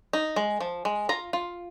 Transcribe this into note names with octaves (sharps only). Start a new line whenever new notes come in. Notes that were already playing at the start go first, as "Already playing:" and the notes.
D#4
G#3
F3
G#3
F4 A#5
F4